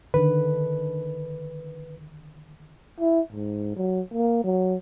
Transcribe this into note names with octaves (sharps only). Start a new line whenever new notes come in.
D3 D#3 B4
E4
G#2
F#3
A#3
F#3